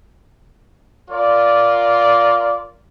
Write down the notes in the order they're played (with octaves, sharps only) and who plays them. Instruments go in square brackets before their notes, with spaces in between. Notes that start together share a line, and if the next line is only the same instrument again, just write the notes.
[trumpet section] F4 A#4 D5